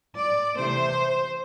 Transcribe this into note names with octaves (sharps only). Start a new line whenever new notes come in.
D5
C3 E3 A3 C5